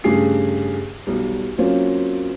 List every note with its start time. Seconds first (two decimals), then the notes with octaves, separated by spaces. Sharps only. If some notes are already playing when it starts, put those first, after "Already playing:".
0.04 G2 C#3 A3 G4 G#4 C7
1.07 B1 G3
1.58 F#3 A#3 C4 C#4 F4